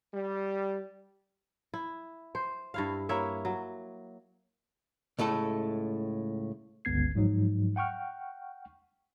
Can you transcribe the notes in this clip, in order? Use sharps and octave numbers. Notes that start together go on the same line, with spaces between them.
G3
E4
C5
G2 E4 F5
A#3 E4 C#5 E5
F#3
C#2 A2 A3 A4
G1 C#2 B3 G#6 C7
G#2 F3 F#3 D#4
F#5 G5 C#6 F6